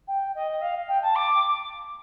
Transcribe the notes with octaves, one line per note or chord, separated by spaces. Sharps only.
G5
D#5
F5
G5
A5
D6